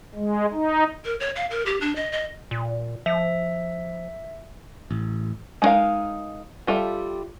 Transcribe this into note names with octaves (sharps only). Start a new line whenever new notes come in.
G#3
D#4
A#4
C#5
F5
A#4
G4
D4
D#5
D#5
A#2
F3 E5
A1
G#3 C4 D#4 A#4 F5
G3 F4 A4 E5